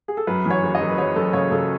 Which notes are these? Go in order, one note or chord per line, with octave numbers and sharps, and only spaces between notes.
G#4
A4
F#2 B4
E3
C#5
F#1
D#5
F#1
B4
F#1 C#5
F#1 A4
C#3 C#5
C#3 A4